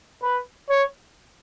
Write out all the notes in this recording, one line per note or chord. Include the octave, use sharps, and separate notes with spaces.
B4
C#5